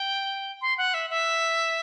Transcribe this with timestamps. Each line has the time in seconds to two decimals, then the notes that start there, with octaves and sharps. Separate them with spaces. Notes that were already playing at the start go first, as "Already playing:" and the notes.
Already playing: G5
0.62 C6
0.78 F#5
0.94 E5
1.10 E5